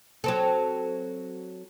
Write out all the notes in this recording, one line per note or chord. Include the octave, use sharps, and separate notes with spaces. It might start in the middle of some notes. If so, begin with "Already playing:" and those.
F#3 C4 A4